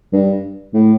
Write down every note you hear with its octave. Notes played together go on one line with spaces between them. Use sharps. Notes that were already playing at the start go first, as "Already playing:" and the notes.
G2
A2